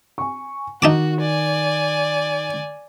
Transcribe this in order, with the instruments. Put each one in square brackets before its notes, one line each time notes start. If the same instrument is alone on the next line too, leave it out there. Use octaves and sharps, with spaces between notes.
[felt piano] G#5 C#6
[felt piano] D#3 [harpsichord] D#4 A5 D6 [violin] F#4
[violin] D5 G#5